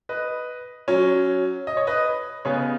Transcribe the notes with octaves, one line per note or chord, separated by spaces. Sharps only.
B4 D#5
F#3 C#4
D#5
C#5
B4 D#5
C#3 B3 D#4 G#4 C#5